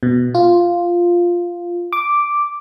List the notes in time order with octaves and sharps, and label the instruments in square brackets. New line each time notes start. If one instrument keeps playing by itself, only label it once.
[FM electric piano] B2
F4
D6